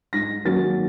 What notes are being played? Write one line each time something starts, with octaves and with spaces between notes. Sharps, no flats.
G#2 A#6
D#3 F#3 A#3 C#4 A6